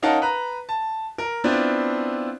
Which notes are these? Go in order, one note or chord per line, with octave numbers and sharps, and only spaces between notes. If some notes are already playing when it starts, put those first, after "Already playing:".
C#4 D#4 A#4 F5 F#5 A5
B4 A#5
A5
A#4
B3 C4 D4 E4 F4